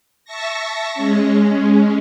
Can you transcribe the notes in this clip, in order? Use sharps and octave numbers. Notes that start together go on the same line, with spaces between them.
E5 A5 C#6 A#6
G#3 C#4